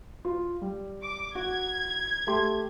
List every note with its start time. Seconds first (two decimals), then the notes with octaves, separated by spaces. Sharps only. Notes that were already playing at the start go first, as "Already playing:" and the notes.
0.25 F4
0.61 G3
1.03 D6
1.35 F#4 G#6
2.27 A3 G4 C6